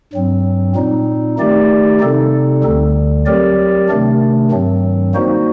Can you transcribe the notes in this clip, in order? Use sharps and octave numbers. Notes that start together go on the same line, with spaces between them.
G2 F#3 C4
A#2 G3 C4 D#4
D#3 A3 D#4 G4 D5
C3 G3 C4 D#4 A4
D2 D3 G3
F#3 C4 G4 A#4 D5
C3 D#3 A3 D4
G2 D#3 F#3 C4
G3 A#3 D#4 F#4 C5